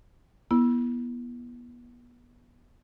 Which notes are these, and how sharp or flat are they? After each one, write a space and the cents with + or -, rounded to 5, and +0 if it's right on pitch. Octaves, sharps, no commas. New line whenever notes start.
B3 -30 E4 +10